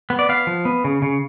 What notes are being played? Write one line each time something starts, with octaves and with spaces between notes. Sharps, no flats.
B3
D5
B3 F5
F3
B3
C#3
C#3